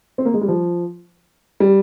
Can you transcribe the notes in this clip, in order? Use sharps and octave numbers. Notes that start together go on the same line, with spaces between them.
C4
A#3
G#3
G3
F3
G3